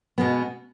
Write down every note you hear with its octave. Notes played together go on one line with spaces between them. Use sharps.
B2 G#3 B3